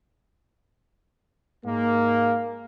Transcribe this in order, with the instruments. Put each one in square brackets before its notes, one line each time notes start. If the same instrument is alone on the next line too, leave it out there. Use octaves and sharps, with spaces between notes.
[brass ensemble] G#2 G#3 A#3